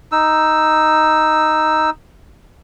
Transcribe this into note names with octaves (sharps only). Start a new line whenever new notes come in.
D#4 E6